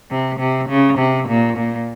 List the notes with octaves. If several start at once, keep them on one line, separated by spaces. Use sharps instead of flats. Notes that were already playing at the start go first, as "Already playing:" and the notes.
C3
C3
C#3
C3
A#2
A#2